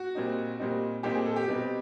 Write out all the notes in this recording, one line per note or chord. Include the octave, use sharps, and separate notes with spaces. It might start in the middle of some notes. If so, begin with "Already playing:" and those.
Already playing: F#4
A#2 G3 C4 D#4
A#2 G3 C4 D#4
A#2 G3 C4 D#4 G4
G#4
A4
G4
B2 G3 C4 D#4